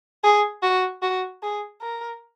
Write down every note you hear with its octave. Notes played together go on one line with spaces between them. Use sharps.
G#4
F#4
F#4
G#4
A#4